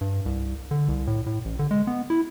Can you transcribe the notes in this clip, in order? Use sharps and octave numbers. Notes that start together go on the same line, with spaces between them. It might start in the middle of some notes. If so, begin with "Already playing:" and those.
G2
C2
D3
C2
A2
A2
A1
D3
G#3
B3
E4